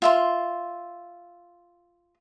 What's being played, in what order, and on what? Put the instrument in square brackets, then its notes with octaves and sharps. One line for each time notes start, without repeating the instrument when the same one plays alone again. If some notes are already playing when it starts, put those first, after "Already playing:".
[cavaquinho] F4 E5 C6